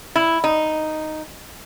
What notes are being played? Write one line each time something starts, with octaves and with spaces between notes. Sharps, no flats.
E4
D#4